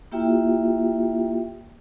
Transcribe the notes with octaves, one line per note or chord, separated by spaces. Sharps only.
A#3 E4 F4 G4 E5 G5